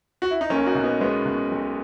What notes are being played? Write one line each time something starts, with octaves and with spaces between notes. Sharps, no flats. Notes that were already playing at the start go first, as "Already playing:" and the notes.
F#4
E4
D#4
B1 A#3 C#4
D#4 F#4
B2
B3 D#4
B1 G#3 B3
B2
B1